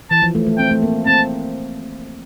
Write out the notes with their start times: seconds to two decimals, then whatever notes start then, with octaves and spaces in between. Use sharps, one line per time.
0.10 E3 A5
0.22 F3
0.35 A3
0.46 A3
0.58 C4 G5
0.70 A3
0.82 A#3
1.06 C4 A5